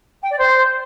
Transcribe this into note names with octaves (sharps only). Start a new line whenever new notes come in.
G5
D5
C5